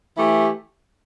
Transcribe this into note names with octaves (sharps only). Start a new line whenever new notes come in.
E3 A3 E4 G4